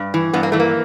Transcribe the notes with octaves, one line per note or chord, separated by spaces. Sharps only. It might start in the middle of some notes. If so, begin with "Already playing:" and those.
Already playing: G2
E3
G2 B3
A#3
E3 A3
A#3